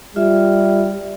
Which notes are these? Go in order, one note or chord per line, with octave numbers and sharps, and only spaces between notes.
G3 F4 E5